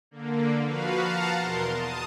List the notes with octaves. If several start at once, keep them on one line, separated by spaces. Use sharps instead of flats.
D3 A#3
F3 F#4 B4 F5
F5 F#5 A5 A#5
E2 B2 A#4 C6
A5 D#6